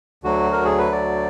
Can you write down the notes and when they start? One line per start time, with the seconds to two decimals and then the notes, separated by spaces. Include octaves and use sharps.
0.24 D2 D3 F#3 F#4
0.52 A#4
0.65 G#4
0.78 B4
0.92 D5